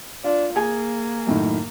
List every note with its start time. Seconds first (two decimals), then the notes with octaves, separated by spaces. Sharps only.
0.24 D4 F4
0.56 A#3 G#4 G#5
1.27 F#2 A2 D#3